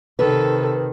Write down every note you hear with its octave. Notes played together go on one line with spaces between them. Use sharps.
C3 D#3 A4 B4